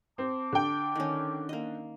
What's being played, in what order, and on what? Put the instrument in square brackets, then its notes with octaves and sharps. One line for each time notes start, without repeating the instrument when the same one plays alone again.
[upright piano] C4 [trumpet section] A5 D6
[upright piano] D3 G5
[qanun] D#3 C#4
A#3 D#5